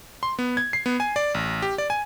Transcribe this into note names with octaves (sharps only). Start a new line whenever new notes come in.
C6
B3
G#6
C7
B3
G#5
D5
A1
G4
D5
G#5